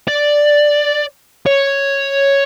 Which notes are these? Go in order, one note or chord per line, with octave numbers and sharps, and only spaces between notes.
D5
C#5